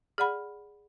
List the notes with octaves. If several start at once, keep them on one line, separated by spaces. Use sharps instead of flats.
G#4 D5 F#5 B5